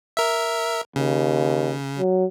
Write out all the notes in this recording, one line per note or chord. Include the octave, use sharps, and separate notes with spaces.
A#4 E5
D#2 C#3
F#3